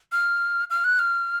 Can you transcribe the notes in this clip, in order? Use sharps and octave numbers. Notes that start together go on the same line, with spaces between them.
F6
F6
F#6
F6